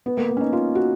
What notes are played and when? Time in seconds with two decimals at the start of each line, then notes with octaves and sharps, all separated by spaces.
0.06 B3
0.17 A#3
0.29 A#3
0.37 C#4
0.41 D#4
0.53 F4
0.75 F#4